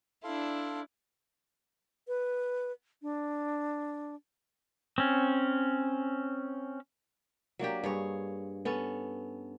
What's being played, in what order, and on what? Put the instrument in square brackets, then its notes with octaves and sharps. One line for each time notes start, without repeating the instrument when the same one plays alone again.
[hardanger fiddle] D4 E4 [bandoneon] A4 F5 C6
[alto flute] B4
D4
[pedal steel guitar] C4 C#4
[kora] F#3 A#3 D4 G4
G2 G#4 C#5
B3 C#4 A4